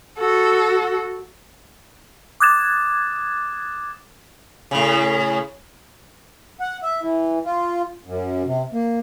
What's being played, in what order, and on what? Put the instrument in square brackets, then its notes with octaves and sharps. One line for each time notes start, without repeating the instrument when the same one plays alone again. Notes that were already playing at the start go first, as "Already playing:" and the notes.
[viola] F#4 A4
[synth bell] D6 D#6 F#6 G#6 A6 E7
[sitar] A2 C#3
[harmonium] F#5
E5
E3
F4
F#2
C3
A#3